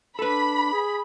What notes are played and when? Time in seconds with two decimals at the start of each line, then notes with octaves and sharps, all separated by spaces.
0.19 D4 A4 B4 B5
0.73 G#4